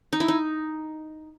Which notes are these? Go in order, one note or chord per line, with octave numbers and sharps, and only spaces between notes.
D#4
E4
D#4